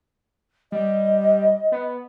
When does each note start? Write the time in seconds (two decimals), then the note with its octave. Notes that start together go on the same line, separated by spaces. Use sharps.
0.72 G3 D#5
1.72 B3